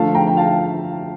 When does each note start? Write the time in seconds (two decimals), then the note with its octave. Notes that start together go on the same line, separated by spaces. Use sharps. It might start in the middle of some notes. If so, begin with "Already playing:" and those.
Already playing: D3 F3 A3 F5 A5
0.15 G5 A#5
0.27 G5
0.37 F5 A5